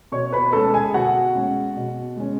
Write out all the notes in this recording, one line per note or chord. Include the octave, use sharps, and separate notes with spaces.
B2 C#5 C#6
B4 B5
G#3 C#4 A4 A5
G#4 G#5
B2 F#4 F#5
G#3 C#4
B2
G#3 C#4